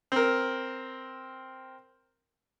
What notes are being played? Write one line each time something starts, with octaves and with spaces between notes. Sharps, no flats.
C4 A#4